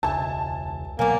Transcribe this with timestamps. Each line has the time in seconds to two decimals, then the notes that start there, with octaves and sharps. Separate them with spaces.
0.03 E1 C#2 E5 G#5 A5
0.99 B2 F#3 A#3 B3 D5 G#5